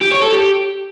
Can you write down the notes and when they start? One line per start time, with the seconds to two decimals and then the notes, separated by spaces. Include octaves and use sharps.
0.02 G4
0.12 C#5
0.22 A4
0.32 G4